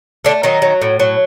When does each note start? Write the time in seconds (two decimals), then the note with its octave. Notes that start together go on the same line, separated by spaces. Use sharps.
0.25 D3 A3 D4
0.43 D#3 F#3 D#4
0.62 F#3
0.82 A2
1.00 F#3